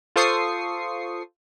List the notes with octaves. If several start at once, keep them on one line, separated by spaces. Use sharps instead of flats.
F4 A4 C5 C#6 D#6 C7